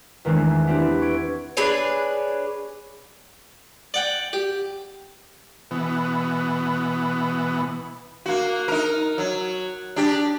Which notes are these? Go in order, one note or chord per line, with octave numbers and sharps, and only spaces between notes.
E2 D#3 G#3 A3 C4 D4
B3 C4 D4 E4 G4
C#6 G#6 D7
D4 G#4 B4 C#5
D5 F#5 G5
G4
B2 E3 B3
A#3 F#4
D#4 A#4
F#3
D4 G4